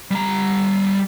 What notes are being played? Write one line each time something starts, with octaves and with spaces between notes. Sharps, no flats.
G3 A#5